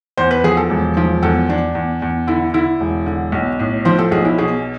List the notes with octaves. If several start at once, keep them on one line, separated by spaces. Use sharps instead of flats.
E2 C5
B4
F3 G#4
A4
E1
F3
E2 A4
E2 D4
E2
E2
D3 E4
D3 E4
E1
D3
B1
A2
F3 C5
A4
B1 G#4
E4
B2 G#4